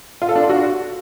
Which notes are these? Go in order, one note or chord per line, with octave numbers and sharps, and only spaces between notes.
F4
A4
D4
F4
F#4